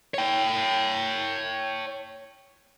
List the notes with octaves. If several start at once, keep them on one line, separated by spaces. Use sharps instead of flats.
C#5 G5